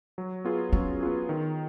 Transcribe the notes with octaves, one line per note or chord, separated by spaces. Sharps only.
F#3
B3 F4 G#4
F#3 C#4
B3 F4 G#4
D#3